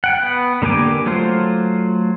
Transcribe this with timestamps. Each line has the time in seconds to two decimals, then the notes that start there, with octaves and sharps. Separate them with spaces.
0.04 F#5 G5
0.22 B3
0.62 D3 A#3 G4 G#5 D6
1.06 F#3 A3 F4 C5